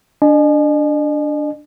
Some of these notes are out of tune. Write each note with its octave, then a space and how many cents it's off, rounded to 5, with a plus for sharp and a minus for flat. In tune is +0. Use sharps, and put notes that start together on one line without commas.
D4 +0 D#5 -45 G#5 +30